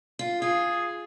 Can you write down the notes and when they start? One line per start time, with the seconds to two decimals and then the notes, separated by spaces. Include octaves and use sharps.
0.19 F4
0.42 F4 G#4